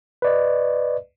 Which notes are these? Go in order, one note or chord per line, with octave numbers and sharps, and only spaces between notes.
B4 D5 D#5